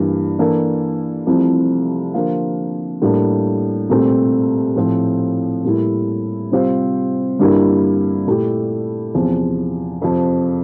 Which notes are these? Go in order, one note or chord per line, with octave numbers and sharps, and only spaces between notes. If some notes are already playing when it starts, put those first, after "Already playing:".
Already playing: G2 E3 A#3
E3 A#3 D4 A4
C2 C3 F3 A3 E4
D3 F3 A#3 F4
A2 G3 A#3 D4
C2 A#2 A3 C4 G4
A2 F3 C4 F4
A2 G3 A#3 E4
C3 G3 C4 F4 C5
G2 D3 G3 A#3 E4
A#2 A3 E4 G4
E2 C3 F3
F2 C3 F3